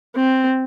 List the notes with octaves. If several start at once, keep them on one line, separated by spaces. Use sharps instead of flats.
C4